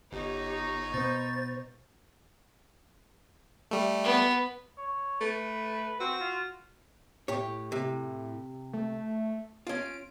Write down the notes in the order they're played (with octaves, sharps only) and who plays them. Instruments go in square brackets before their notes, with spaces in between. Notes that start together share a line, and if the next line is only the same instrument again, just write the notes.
[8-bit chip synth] G1 [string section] D#4 C#5 [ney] G4
[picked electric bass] B2 B3 [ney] C5 [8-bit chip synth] A6
[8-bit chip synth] G3 A3
[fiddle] B3
[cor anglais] C#5
[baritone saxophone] A3 [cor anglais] B4
[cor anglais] C4 [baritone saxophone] F#4
[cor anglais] F4
[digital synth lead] A2 [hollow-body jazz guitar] G4 C#5
[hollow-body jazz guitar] C3
[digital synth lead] A3
[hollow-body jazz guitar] C#4 F4 [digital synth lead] D7